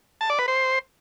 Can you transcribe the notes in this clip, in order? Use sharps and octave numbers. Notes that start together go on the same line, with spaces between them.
A5
D5
B4
C5